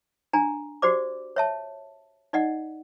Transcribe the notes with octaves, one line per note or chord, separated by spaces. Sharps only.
D4 G#5 A#5
F#4 G4 C5 D5 D6
C#5 E5 A5
D#4 D5 D#5 F#5